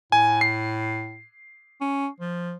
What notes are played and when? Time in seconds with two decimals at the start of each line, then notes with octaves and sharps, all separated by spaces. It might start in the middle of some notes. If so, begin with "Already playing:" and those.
0.12 A2 G#5
0.41 C7
1.81 C#4
2.20 F3